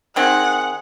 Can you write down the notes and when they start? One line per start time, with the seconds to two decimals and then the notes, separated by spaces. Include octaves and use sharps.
0.16 D#3 C4 G#4 F#5